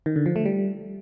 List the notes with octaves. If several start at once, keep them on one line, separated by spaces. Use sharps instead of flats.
D#3
D3
F3
A3
G3